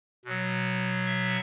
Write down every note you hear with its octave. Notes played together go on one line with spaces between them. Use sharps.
B2 F#3
E5